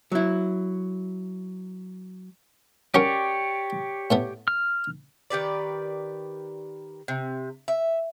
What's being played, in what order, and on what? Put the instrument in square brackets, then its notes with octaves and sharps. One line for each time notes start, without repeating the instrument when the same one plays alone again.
[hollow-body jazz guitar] F#3 E4
[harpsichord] C#4 F#4 A#4 [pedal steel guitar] G4 C#5 D5
[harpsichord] A2 A3 B3
[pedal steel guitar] F6
[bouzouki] D#3 G4 B4 D5
C3
E5